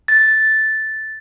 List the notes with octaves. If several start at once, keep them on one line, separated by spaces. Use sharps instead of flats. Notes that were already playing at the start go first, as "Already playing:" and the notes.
A6